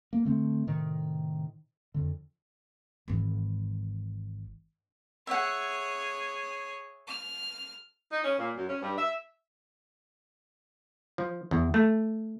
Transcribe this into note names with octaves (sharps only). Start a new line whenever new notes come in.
A#3
D3 A3 C4
A2 C3 D#3
F2 D3
G#1 E3
G#4 C#5 E5 F#5
F6
D#4
C#4
A#2
F#2
C#4
G2
E5
F3
E2
A3